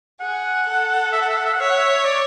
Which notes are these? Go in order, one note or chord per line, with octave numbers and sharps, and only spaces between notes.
G#4 F#5
A4
E5
F#5
E5
F#5
E5
F#5
C#5 E5
F#5
E5
D5